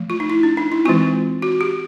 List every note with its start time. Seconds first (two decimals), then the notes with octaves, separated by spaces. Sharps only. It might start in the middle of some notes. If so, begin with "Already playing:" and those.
Already playing: F3 A3
0.10 F4
0.20 D#4
0.30 E4
0.43 D4
0.57 D#4
0.72 E4
0.85 E3 G#3 C4 F4
1.42 F#4
1.61 G4